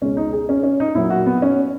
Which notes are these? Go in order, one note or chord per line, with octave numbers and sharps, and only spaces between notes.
C#2 B2 G#3 C#4
D#4
G#4
C#4
C#4
D#4
A#2 F#3 E4
F#4
B3
C#4